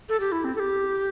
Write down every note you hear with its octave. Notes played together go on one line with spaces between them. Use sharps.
A4
G4
E4
C4
A4
G4